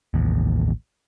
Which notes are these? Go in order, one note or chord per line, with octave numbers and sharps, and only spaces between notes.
A1 D#2